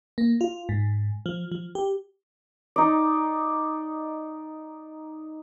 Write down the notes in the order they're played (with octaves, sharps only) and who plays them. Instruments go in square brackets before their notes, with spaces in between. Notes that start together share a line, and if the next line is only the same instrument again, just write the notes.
[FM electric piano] A#3
F4
G#2
F3
F3
G4
[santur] D#4 D5